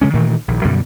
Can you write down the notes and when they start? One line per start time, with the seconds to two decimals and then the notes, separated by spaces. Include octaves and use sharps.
0.01 C#3 G#3 C#4
0.14 A#2 D#3 E3 A3
0.48 A#1 D#3
0.64 F#2 B2 D3 G3